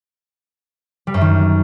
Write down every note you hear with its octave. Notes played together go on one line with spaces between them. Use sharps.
G3
F#2
D#3